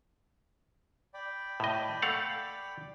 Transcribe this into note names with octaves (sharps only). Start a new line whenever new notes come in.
D5 G5 B5
A2 D#5
A3 F5 F#5